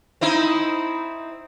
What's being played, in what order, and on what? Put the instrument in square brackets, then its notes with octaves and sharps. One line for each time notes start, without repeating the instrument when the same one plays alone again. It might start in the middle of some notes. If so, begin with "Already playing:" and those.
[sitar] C4 D#4 E4